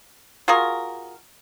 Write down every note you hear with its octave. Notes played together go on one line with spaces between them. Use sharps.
F4 F#4 G#4 A#4